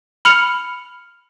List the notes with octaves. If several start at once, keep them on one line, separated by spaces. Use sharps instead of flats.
B5 F6 C#7 F7